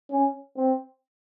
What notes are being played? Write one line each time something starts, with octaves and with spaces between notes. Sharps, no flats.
C#4
C4